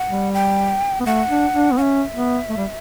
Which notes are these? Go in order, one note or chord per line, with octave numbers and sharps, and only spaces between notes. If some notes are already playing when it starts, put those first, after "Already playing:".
Already playing: F#5
G3
G5
B3
A3 F#5
D4
D4
B3
C#4 E5 F#5
B3
A3
G3